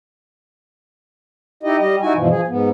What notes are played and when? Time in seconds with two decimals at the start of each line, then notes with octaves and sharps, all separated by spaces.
1.63 D#4 E4 G4 D#5
1.79 G3 G4 D#5
2.02 D#4 E4 F#4 G#5
2.15 G2 B2 E3 F3
2.30 F3 G#4
2.48 G#2 B3